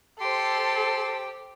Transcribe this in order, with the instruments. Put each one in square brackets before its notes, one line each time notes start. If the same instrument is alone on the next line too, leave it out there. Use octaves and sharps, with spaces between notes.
[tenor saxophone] G4 [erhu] A4 [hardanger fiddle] C5 C6